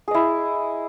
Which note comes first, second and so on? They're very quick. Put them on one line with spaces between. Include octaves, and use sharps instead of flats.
G#4 D#5 E4